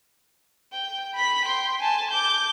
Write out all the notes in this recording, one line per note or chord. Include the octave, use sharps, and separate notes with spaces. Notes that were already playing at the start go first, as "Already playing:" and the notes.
G5
B5 B6
G5 C6
G#5 A5
D6 G6